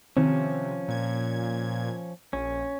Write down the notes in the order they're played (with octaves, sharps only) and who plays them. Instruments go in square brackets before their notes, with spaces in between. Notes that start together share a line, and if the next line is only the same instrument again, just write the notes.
[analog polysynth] C3 [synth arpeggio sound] D#3 C4 [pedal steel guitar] F3 C#4
[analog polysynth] A#2 G#6
[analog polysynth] A#1 [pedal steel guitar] C#4